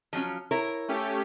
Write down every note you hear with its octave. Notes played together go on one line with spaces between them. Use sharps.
F3 F#3 C#4
E4 A#4 C#5
A3 C#4 G4